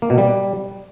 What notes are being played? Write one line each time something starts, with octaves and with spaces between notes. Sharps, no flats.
A#3
B2
G3